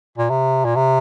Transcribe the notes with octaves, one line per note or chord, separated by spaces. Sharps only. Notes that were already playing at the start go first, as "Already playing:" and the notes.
A#2
C3
A#2
C3